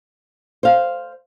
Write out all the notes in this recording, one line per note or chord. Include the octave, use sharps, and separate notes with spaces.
C5 F5